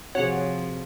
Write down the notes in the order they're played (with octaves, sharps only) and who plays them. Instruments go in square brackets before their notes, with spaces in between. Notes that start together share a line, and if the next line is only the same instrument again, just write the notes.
[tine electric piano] C3 C4 [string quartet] F3 [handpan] F#4 G#4 [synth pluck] C#5 F#5